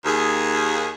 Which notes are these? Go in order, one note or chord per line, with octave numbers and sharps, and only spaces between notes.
D#2 G#4